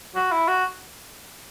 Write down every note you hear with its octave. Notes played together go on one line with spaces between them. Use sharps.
F#4
E4
F#4